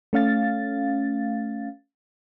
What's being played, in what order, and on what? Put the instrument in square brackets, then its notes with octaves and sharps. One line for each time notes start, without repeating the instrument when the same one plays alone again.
[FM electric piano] A3 C#4 F5 A6